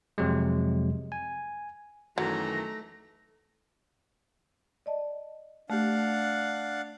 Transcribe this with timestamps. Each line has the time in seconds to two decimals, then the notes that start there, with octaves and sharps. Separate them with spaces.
0.18 F2 C3 F#3 G#3
1.12 G#5
2.18 F#2 D#3 E3 F#3 A3 A#5
4.86 D5 D#5 A5
5.70 A3 D4 G4 F5 F#5